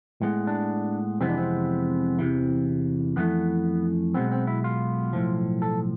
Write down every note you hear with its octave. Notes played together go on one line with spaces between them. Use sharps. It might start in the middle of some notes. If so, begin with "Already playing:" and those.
A2 G#3 B3
D4
F2 C3 E3 G#3 B3 C4
D4
C4
E2 C3 E3
F2 E3 A3 B3
B1 B2 G#3 B3 C4
C4
E4
F4
B1 A2 F3
A4